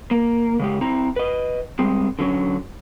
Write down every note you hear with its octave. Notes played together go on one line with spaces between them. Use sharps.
A#3
C#3 G#3 G4
C4 E4 A#5
B4 D#5
G3 G#3 C4
D3 F#3 C#4